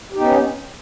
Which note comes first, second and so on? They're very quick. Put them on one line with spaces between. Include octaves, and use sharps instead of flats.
G4 D#4 B3 C#4